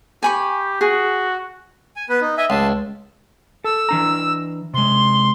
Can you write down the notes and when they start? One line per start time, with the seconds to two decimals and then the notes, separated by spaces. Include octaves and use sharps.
0.23 G4 G#5 B5 C#6
0.81 F#4 G#4
1.96 G#5
2.09 B3 B4
2.21 D#4
2.38 D#5 E5 G#5
2.50 C#2 A5 C6
3.64 A4 E6
3.89 E3 D4 A#5
4.74 C3 G#3 C6